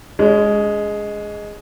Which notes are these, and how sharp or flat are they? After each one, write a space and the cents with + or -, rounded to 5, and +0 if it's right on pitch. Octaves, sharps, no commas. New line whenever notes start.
G#3 +0 C#4 +45